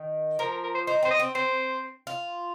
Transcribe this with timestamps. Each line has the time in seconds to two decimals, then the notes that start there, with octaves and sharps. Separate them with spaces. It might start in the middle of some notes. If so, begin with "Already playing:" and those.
Already playing: D#3
0.39 F3 A#4
0.51 A#4
0.64 A#4
0.75 C5
0.87 D#4 C5
1.03 C4 C5
1.11 D#5
1.19 C4
1.35 C4 C5
2.07 F4